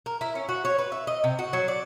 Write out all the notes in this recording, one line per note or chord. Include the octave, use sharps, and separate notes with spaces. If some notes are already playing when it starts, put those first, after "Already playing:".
A#4
E4
C#4
F#4
C#5
B4
E5
D#5
C3
F#4
F#3
D5